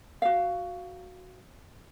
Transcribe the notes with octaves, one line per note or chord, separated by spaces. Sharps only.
F#4 F5